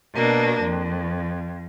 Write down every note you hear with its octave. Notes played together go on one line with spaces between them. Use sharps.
B2 A#3 D4
F2